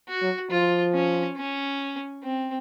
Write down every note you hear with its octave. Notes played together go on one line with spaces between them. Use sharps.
F#4
F#3
F3 F4
C#4
C#4
C4